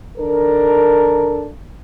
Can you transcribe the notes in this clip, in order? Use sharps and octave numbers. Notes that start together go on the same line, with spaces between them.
D#3 D4 A4 A#4